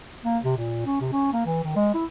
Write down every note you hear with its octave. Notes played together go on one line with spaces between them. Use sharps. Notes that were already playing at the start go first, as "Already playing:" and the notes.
A#3
C3
A#2
C#4
C3
C#4
A#3
E3
D#3
G#3
E4